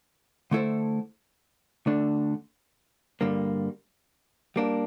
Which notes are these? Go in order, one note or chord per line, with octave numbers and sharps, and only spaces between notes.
D3 A3 E4 A4 C5
D2 D3 A3 D4
G2 D3 G3 A#3
G3 A#3 D4